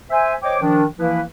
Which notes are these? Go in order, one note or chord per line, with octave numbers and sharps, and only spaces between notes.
C5 E5 G#5
C5 C#5 D#5 G5 D6
D#3 F3 D4
E3 F3 A#3 E4 B4